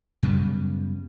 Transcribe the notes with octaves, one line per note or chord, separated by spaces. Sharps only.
F#2 C#3 G3 B3